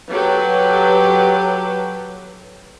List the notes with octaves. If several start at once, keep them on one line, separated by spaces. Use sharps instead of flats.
F#3 G4 A4 B4